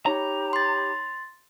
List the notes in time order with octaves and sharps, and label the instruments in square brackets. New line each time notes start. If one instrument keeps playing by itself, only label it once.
[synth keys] D#4 C#5 B5 [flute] G4 [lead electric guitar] A#5
[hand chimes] C6 A6